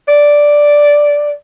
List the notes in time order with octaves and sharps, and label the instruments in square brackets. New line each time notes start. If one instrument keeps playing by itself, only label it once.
[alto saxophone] D5